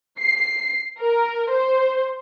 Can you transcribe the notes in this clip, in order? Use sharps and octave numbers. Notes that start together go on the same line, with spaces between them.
C7
A#4
C5